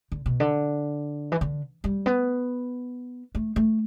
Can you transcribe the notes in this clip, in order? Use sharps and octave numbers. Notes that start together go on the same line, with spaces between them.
D3
B2
D3
E3
D3
G3
B3
A3
A3